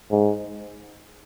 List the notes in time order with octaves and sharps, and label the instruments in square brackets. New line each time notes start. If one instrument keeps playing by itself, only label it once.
[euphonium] G#2